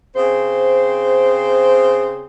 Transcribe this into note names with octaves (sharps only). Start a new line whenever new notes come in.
C#3 C4 C5